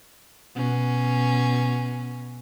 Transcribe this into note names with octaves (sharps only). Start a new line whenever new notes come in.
B2 C#4